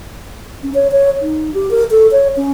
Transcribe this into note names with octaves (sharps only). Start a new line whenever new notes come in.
C#4
C#5
C#5
D#4
G4
A#4
A4
C#5
C#4